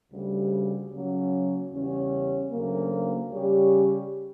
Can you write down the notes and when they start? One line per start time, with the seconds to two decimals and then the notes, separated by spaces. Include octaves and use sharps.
0.12 D2 C#3 G3
0.92 C#3 F#3 A#3 C#4
1.71 E2 C#3 G3 C#4
2.52 D2 C#3 F#3 A#3
3.32 C#3 G3 C#4 G4